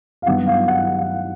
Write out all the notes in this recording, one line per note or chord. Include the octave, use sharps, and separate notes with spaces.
F5
G2 D#3 F#3 B3 F#5
F5
F#5